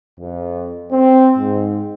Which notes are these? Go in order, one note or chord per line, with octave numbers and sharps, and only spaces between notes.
F2
C4
G#2